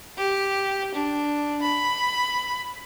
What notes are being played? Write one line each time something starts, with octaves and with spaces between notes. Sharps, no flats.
G4
D4
B5